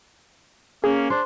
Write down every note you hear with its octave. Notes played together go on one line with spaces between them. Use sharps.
A#3 C#4 G#4
D4 C5